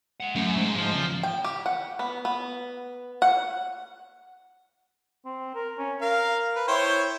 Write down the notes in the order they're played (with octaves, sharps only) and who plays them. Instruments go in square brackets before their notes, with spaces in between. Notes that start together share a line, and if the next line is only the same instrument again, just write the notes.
[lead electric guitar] G#3 F#5
[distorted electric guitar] F#2 [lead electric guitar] A3
[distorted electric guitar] G#2
[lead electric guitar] G#2 [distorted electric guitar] F3
[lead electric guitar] E2 C#3
[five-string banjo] G5
G4
F#5
B3
B3
F#5
[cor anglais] C4
A#4
C#4
[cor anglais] A#4 [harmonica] F5
[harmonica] B4
[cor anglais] E4 [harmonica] C5 C#5 G5